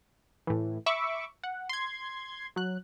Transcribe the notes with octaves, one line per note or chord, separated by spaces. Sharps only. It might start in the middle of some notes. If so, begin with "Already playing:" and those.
A2 E3
E5 B5 C#6 D6 E6
F#5
C6 G#6
F#3 F#6